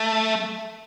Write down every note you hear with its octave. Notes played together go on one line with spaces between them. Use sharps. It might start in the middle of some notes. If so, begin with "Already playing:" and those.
Already playing: A3